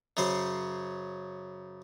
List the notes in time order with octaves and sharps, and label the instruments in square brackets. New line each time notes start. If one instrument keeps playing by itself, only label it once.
[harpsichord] F#2 C#3 C5 C6